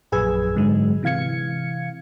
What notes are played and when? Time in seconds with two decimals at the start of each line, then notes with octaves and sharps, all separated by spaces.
0.12 A#1 F#2 G#4 B4 E6 G#6
0.56 G#2 D3 F#3 G#3
1.03 C3 E3 F5 G#6 C#7